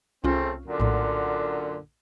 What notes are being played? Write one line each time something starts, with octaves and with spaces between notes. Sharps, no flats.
C2 C#3 A3 C4 C#4 F4
F#2 A#2 D3
A#1 A2